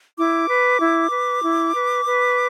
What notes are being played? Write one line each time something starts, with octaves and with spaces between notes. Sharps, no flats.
E4 D6
B4
E4
B4
E4
B4
B4